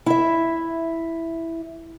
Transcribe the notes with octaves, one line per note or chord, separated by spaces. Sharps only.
E4 E5